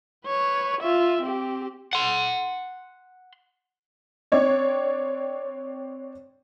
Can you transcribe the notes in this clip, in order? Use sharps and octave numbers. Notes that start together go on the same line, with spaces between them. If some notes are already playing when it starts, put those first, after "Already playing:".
B4 C#5
F4 E5
C4 G4
F#5 C6
C4 D4 C#5 D5